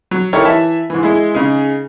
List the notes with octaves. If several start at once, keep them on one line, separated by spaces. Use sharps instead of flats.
F#3
D#4 E4 G4 A4 A#4 C#5
E3 E5 A5
G#2 E3
G#3 E4
C#3 D#4 G#4